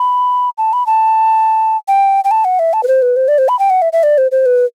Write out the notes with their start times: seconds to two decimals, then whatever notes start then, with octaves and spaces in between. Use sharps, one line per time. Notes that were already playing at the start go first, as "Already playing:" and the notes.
Already playing: B5
0.58 A5
0.73 B5
0.87 A5
1.88 G5
2.24 G5
2.31 A5
2.45 F#5
2.59 E5
2.73 A5
2.83 B4
2.88 C5
3.02 B4
3.16 C5
3.28 D5
3.38 C5
3.48 B5
3.59 G5
3.70 F#5
3.82 E5
3.93 E5
4.03 D5
4.18 C5
4.31 C5
4.46 B4